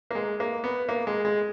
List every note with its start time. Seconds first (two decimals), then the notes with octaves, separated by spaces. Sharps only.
0.11 A#3
0.15 G#3
0.40 A#3
0.64 B3
0.89 A#3
1.07 G#3
1.25 G#3